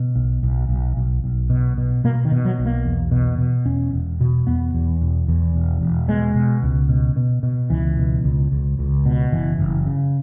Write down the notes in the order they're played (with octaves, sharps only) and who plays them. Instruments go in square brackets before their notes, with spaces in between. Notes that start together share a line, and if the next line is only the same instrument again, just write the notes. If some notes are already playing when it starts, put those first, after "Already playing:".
Already playing: [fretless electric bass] B2
B1
B1
B1
B1
B1
B2
B2
B2 A#3
D#3
B2
F#3
B1
A#3
E2
B2
B2
E1 C#4
E1
B2
E2 B3
E2
E1
E2
E1
E1
B2 G#3
B2
C#2
B2
B2
B2
C#2 E3
B2
C#2
C#2
C#2
B2
F#1 E3
F#1
C#3